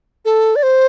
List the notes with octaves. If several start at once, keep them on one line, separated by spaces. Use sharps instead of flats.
A4
D5
C5